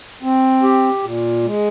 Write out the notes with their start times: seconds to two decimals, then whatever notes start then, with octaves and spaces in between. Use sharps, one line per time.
0.23 C4
0.63 G4
1.04 A#2
1.45 G#3